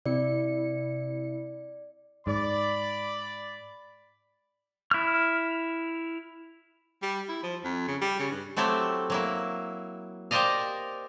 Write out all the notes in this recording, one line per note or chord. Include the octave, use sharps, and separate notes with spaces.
C3 E4 D5 C#7
G#2 D5 B5
E4 F6
G3
E4
F3
F2
C#3
G3
C#3
G2
F#3 A3 C4 E4 G4
F#3 A#3 E4
G4 A#4 C5 D5 D#5 F5